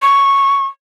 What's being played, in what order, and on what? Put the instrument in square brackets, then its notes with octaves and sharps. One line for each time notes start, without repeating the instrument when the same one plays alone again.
[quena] C#6